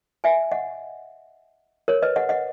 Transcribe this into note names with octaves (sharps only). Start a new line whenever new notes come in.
E5 G#5
D#5 F#5
A#4 C#5
B4 D#5
D#5 F#5
D#5 F#5